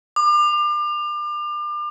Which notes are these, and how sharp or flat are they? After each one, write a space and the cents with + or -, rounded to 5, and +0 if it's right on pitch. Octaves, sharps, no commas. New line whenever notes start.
D6 +35